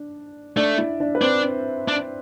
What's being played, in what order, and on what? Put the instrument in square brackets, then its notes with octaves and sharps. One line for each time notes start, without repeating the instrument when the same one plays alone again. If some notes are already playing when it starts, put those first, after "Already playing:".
Already playing: [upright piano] D4
[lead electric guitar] A3 [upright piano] D4 D5
[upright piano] E4 E5
D4 D5
B4
[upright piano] C4 C5 [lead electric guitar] D4
[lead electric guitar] D4